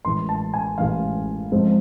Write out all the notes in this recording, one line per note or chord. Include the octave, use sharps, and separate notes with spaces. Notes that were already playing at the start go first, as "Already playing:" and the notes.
A1 A2 E3 G#3 C6
A5
G#5
A1 A2 E3 G#3 F5
G#2 F3 G#3 C4